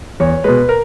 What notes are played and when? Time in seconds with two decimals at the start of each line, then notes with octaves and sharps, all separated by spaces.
0.20 E2 C#5
0.44 B2 G#3 B4
0.69 A#4